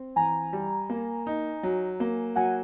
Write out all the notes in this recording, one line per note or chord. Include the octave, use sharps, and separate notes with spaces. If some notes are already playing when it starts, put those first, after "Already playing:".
Already playing: C4
E3 G#5 A#5
G3
A#3
D#4
F#3
A#3
F#3 F#5 G#5